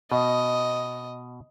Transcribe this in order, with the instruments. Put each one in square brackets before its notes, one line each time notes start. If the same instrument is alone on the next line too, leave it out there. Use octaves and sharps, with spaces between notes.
[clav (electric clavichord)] B2 [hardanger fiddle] D#5